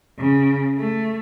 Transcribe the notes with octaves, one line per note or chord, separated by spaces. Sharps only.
C#3
A3